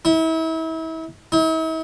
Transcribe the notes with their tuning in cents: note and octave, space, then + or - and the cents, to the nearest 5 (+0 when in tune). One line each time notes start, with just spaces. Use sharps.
E4 -35
E4 -45